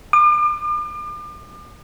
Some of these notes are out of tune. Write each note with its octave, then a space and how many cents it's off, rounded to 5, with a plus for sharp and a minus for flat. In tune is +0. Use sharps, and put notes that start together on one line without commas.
D6 +40